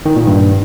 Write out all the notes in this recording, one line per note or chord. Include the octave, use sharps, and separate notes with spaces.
D#3
A#2
G2